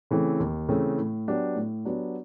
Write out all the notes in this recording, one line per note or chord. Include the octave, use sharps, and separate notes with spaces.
C#3 E3 A3 C4
D#2
C#3 E3 A3 C4
A2
F#3 B3 D4 G4
A2
F#3 B3 D4 G4